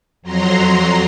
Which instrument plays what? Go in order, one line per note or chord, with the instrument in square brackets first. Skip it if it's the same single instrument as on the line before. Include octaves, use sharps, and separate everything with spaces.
[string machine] F2 F#3 A#5 C6